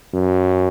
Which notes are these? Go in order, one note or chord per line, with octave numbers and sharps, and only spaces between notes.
F#2